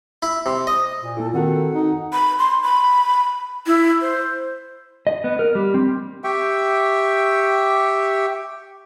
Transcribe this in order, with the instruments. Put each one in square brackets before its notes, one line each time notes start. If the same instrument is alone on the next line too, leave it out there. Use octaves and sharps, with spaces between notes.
[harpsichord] E4
C3
D#5
[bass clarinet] A#2
[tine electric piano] A#3 E4 F4 [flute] A4
[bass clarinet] D#3 [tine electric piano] C4 F#4 A4 [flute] F#5
[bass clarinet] D#4
[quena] B5
C6
B5
E4
C5
[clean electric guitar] D#5
B3
A#4
G3
C4
[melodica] G4 E5 G5 C#6